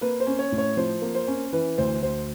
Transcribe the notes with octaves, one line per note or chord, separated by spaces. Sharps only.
A#3 B4
C5
C#4
C#5
A2
C#5
F3 C5
A#3
C5
C#4
E3 B4
D2 C5
D2 C5